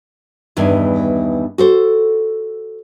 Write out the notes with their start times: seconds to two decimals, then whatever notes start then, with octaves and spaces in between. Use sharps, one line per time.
0.57 E2 G2 D#3 E3
1.58 F#4 A4 C5